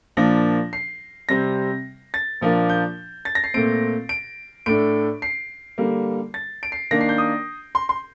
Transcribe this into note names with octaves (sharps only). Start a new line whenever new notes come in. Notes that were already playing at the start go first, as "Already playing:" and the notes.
A#2 F3 A#3 D4 A#6
C7
C3 G3 C4 A#6
A6
A#2 F3 A#3 D4
G6
A6
A#6
C7
A#2 A3 C4 D7
D7
A2 A3 D4 D7
C7
D3 G3 A#3
A6
D7
C7
D#3 A#3 D4 A#6
C7
G6
D#6
C6
C6